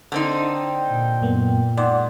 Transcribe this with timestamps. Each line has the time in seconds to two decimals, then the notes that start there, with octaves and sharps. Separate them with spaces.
0.12 D3 C4 D#4
0.47 G5
0.89 A#2
1.22 F#2 A#3 B3
1.77 G#2 D5 F#5